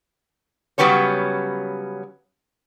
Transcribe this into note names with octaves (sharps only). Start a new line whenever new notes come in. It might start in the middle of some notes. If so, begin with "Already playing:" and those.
C#3 F#3 G3 B3 C#4 C#5